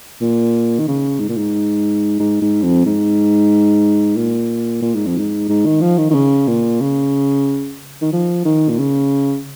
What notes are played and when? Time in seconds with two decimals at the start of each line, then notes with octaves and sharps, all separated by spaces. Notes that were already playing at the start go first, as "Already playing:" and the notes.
0.21 A#2
0.79 D#3
0.88 C#3
1.20 G#2
1.29 A#2
1.37 G#2
2.19 G#2
2.42 G#2
2.63 F2
2.86 G#2
4.16 A#2
4.82 A#2
4.95 G#2
5.06 F2
5.18 G#2
5.49 G#2
5.66 D#3
5.81 F3
5.98 D#3
6.10 D#3
6.14 C#3
6.48 A#2
6.81 C#3
8.01 D#3
8.12 F3
8.45 D#3
8.69 A#2
8.79 C#3